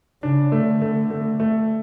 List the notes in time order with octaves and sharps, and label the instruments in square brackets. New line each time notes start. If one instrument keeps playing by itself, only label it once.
[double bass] C#3 [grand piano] D4
[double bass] D3 [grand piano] A3
[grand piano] A3
A3
A3